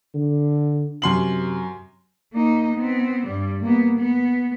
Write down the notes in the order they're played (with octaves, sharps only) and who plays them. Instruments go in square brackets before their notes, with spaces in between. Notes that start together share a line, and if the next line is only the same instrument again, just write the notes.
[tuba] D3
[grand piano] F#2 C6 F#7 [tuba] C3
[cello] A#3 D#4
B3 C4
G2 G3
A#3 B3
B3